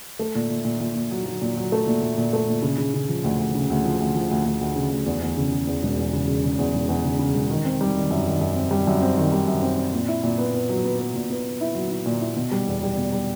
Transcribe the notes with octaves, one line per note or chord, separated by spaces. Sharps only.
A3
A#2
A#2
A#2
A#2
A#2
F#3
F#3
A#2
F#3
A3
A#2
A#2
A#2
A3
A#2
C#3
C#3
C#3
F3
D2
D2
C#3
D2
F3
D2
F3
D2
D2
D2
C#3
D2
E2
E2
C#3
C#3
E2
E1
E2
C#3
C#3
C#3
E2
E1
E2
C#3
C#3
E1
D#3
C4
G3
D#3
F#2
D#3
F#2
C4
G3
F#2
C4
D#3
G3
F#2
C4
C4
A#2
E4
A#2
B3
B3
F#3
B3
B3
A#2
B3
B3
E4
F#3
E4
A#2
E4
B2
G3
E2
G3
B2
G3